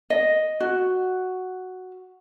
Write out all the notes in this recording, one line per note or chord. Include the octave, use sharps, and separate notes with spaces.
D#5
F#4